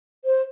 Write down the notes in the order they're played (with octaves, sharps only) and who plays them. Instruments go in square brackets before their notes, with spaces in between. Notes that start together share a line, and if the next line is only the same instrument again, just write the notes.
[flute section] C5